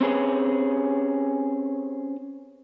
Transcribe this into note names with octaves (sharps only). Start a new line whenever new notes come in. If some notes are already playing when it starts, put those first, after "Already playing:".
C4 C#4 G4 G#4 B4